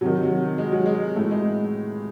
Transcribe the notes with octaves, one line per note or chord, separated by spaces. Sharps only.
C3 D#3 F#3
F#3
G#3
F#3
G#3
A2 E3 A3
G#3